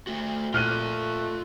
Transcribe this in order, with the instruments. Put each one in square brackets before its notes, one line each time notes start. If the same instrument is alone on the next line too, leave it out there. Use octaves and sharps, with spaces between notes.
[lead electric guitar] A3 F#4
[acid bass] A#2 [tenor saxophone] A3 [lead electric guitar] F4 G5 [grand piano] F6 F#6 D#7